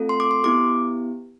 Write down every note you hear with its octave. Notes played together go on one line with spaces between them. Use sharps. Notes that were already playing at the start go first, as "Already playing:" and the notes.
Already playing: A3 C4 F4 A4
C6
D6
C6
B3 E4 G4 D6